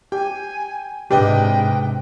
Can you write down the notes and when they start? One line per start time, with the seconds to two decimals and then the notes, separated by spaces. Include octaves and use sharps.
0.12 G4 G5 G#5
1.11 G#2 C3 D4 G4 B4 D#5 G5